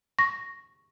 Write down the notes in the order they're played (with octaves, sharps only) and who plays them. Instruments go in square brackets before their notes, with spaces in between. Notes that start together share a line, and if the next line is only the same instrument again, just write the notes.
[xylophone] C#6 [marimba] A#6